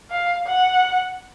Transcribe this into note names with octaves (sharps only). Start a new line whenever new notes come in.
F5
F#5